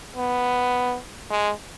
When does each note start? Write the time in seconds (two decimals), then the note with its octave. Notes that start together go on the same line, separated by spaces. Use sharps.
0.16 B3
1.31 G#3